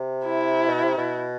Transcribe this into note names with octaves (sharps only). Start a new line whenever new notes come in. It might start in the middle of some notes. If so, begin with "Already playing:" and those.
Already playing: C3
E4
B2
C3
B2